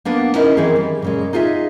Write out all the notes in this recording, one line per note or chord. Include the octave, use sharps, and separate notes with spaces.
A#3 B3 D4 B4
C#4 D#4 E4 A#4 D#5
D#3 E3 C4 G#4
G3
A#2 C#3 G#3
D#4 F4 G#4 D5 E5